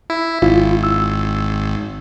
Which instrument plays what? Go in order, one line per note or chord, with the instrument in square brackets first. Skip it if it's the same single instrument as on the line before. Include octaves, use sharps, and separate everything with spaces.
[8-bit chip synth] E4
[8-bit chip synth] G#1 [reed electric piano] E4 F4
[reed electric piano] E6